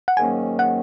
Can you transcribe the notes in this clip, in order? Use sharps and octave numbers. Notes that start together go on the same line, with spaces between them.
F#5
G#2 D#3 F#3 A#3 C#4 G#5
F#5